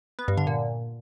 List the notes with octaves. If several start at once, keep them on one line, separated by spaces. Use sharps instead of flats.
B3
G2
D3
A#2